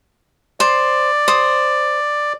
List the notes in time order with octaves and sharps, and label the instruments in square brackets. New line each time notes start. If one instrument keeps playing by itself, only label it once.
[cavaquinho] C5 [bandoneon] D5
[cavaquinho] C5 D#6